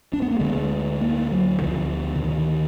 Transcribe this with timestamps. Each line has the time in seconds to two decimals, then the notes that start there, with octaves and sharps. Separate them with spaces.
0.13 D4
0.22 B3
0.31 A#3
0.39 D2 D3 G#3
1.01 A#3
1.31 F#3
1.62 D2 D3 F3
2.16 D3
2.24 D#3